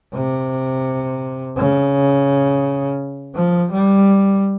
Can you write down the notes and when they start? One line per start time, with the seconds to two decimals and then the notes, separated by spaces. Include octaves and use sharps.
0.14 C3
1.57 C#3
3.35 F3
3.72 G3